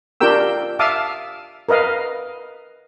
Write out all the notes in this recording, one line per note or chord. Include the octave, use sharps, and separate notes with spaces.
D4 F4 G4 A#4 G5 E6
E5 F5 A5 D6 D#6
A#4 B4 D#5 F5